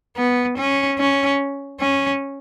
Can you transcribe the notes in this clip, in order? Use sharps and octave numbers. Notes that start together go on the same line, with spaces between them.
B3
C#4
C#4
C#4